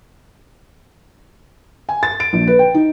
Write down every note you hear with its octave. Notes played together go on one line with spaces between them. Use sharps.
G#5
A6
D7
A#1
B4
G5
D#4